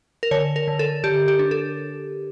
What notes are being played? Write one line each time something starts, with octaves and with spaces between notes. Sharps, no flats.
A#4
D3 C#5
A#4
D3
A4
D3 G4
G4
D4
A4